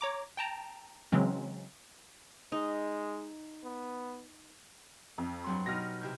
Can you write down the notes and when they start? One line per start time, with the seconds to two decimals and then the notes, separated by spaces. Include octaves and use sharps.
0.01 C#5 A#5 D6
0.37 G5 A5 A#5
1.12 C#3 E3 F#3 G#3 C4 C#4
2.52 G#3 D#4
3.64 B3
5.18 F2
5.44 G2 F#3 C6
5.66 B2 F#3 D#4 F6 A#6
6.01 C3 E4 G6